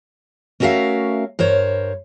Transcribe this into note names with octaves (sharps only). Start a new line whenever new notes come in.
A3 C#4 F#4 A#4 E5 F5
G2 A#4 C5 C#5